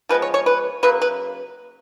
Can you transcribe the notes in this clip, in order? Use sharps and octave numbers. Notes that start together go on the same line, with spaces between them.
F3 G#3 B3 B4
C#5
C#5
B4
C#3 F#3 A#3 B4
B4